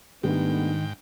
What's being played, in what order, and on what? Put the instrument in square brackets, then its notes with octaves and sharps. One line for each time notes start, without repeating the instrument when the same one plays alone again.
[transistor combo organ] G#2 G5 [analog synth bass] D#3 [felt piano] G3 D4 D#4 [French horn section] A3 B3